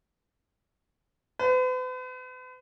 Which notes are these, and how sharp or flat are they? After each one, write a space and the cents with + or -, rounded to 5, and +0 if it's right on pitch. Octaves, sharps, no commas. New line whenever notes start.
B4 +45